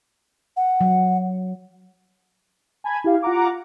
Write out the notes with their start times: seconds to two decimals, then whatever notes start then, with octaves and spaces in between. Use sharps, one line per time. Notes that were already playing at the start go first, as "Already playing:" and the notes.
0.57 F#5
0.81 F#3
2.84 G#5 A5 B5 G#6
3.04 E4 G4 F5
3.22 F4 F#5 A#5 D6